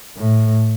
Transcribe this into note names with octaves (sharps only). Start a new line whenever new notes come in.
A2